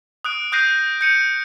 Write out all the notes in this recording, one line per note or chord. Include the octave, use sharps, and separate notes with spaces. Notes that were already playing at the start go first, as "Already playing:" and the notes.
D#6 F#6 D7
D#6 F#6 G6 A#6 C7 D#7
G6 C#7 D#7